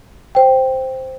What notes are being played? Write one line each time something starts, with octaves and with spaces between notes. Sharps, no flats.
C5 G5